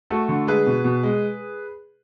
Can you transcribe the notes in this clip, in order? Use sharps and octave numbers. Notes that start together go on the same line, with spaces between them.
A3 F#4 A4
D3
G#3 G#4 B4
B2
B2
G#3